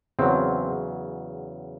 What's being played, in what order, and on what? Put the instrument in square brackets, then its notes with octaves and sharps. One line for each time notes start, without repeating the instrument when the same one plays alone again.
[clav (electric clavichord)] E2 C#3 F#3 C4